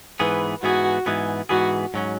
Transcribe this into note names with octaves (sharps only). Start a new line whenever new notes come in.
G#2 E3 B3 G#4 B4
G#2 E3 B3 F#4 G#4
G#2 E3 B3 G#4
G#2 E3 B3 F#4 G#4
G#2 F#3 C#4